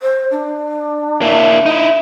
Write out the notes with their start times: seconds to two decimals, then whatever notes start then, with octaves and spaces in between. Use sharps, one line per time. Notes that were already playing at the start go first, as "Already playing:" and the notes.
0.02 C5
0.31 D4
1.22 A#3 E4
1.66 D#4 E4